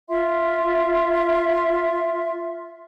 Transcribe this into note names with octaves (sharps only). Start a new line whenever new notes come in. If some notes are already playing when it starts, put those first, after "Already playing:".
F4 E5 C6